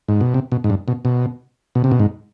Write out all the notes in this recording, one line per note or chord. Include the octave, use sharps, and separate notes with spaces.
G#2
B2
C3
B2
G#2
G2
B2
B2
B2
C3
B2
G#2